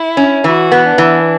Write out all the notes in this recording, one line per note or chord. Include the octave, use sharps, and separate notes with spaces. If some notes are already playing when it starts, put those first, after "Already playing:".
Already playing: E4
C#4
E3 F#4
B3
D4
E3